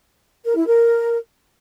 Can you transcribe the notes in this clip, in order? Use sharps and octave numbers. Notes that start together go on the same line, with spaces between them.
A#4
E4
A#4